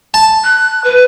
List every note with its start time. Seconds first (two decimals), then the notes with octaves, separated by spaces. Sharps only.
0.14 A5
0.44 F#6
0.84 B4